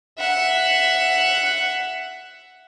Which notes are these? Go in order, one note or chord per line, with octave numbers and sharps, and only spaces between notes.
E5 F#5